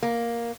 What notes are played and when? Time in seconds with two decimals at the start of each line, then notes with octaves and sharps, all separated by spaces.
0.03 A#3